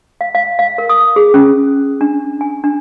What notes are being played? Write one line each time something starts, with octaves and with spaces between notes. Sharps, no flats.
F5
F5
F5
A#4
D#6
G#4
C#4
D4
G#5
D4